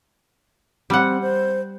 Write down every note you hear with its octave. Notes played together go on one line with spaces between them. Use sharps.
G3 C4 F#5
C5